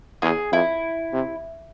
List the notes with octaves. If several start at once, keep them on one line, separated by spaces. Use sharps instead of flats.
E2 G#4
F2 E4
C3